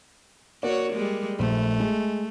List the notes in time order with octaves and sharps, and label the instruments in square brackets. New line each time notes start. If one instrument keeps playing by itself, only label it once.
[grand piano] A#3 D5 [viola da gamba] F#4 C#5
[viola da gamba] G3 G#3
[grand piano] A#1 [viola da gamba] A3
[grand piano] G#3